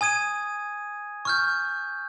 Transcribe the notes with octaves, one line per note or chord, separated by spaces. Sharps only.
G#5 D#6 G#6 D#7
C#6 F6 G6